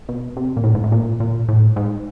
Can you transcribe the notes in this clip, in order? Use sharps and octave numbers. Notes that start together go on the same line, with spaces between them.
B2
C3
A#2
A2
G#2
A2
A#2
A#2
A2
G#2